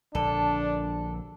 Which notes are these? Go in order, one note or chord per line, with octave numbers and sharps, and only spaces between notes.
A#1 D3 D4 A4